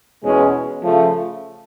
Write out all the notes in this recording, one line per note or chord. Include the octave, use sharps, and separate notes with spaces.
E2 B2 G#3 C#4
C#3 F3 A3